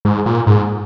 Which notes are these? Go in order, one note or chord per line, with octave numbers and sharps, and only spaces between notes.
G#2
A#2
G#2